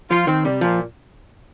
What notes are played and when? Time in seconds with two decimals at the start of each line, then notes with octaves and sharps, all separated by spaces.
0.11 F3 F4
0.27 D#3 C4
0.45 C3 G3
0.61 A#2 F3